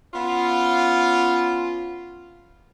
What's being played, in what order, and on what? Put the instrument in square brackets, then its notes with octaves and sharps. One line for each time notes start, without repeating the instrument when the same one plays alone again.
[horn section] B3 C#4 F4